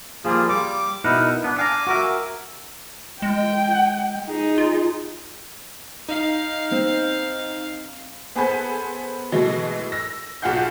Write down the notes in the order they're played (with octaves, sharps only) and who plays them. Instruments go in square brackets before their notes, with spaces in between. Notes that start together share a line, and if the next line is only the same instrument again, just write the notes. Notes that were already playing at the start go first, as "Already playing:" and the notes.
[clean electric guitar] F3 G3 [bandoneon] A#3 F4 G#4
[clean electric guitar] G3 [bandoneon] D6
[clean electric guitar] B2 A#4 F#5 [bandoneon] D#4 E4
[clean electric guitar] B3 [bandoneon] D4
[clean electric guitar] F5 A#5 [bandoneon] G#5 D6
[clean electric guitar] F#4 A#4 E5
[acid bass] G#3 [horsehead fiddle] G5
[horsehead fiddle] D#4 G#4
[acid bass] F4
[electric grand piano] D#4 [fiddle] F5
[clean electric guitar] C4
[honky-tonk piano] B3 G#4 A4 B4 C5 G#5
B2 E3 F#3 G#3 A3
E6 A#6
B1 F4 G#4 F5 F#5 G6